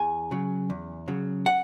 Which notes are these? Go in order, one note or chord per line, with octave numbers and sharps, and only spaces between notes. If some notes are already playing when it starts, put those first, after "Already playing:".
Already playing: E2 G#5
C#3 F#3
E2
C#3 F#3
F#5